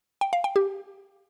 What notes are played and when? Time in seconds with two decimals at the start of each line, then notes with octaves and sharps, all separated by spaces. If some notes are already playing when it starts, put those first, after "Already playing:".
0.21 G5
0.33 F5
0.44 G5
0.56 G4